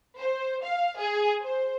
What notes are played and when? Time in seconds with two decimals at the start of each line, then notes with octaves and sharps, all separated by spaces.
0.17 C5
0.62 F5
0.98 G#4
1.41 C5